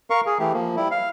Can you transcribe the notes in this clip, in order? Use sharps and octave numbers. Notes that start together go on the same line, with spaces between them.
A#4 F5 C#6
G#4
E3 A3 G4
F3 A#3
G3 E4
F5